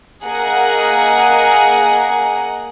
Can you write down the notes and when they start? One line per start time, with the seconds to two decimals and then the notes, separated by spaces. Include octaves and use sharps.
0.24 A#3 G#4 A#4 D#5 F#5